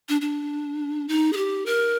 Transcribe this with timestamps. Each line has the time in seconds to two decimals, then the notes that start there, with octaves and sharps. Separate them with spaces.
0.09 D4
0.21 D4
1.08 D#4
1.33 G#4
1.37 G4
1.66 A#4